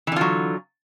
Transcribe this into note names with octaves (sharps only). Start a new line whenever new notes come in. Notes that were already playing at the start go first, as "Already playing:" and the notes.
D3 E3 F#3 F4